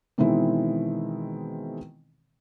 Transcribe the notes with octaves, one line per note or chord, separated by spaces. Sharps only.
B2 D#3 E3 G#3 C4 E4